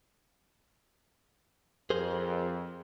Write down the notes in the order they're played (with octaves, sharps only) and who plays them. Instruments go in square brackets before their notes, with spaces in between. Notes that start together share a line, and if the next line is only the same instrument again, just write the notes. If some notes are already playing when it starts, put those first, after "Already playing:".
[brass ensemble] F2 [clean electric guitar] G#4 A#4 C5